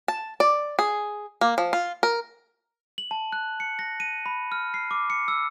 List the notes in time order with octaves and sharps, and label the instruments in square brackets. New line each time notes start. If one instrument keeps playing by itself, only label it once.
[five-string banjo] A5
D5
G#4
A#3
F3
F4
A#4
[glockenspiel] F#7
A5
F#6
C#7
A#6
D#7
B5
F6
C7
D6
C#7
E6